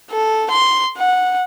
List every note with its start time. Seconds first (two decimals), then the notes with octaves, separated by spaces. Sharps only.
0.11 A4
0.51 C6
0.97 F#5